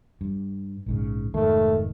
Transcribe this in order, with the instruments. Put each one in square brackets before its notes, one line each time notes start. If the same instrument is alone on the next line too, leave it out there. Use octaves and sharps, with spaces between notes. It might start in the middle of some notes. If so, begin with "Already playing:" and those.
[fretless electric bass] G2
A#1 G#2 C#3
[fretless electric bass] F1 G#2 D#3 [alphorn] A3